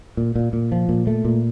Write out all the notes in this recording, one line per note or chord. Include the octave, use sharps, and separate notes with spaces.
A#2
A#2
A#2
F3
A#2
A3
A#2